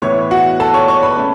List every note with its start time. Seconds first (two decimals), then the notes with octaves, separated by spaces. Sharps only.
0.02 A2 E3 B3 E4 C#5 C#6
0.31 F#4 F#5
0.60 A4 A5
0.74 C#5 C#6
0.88 C#5 C#6
1.03 B4 B5
1.17 A3 C#4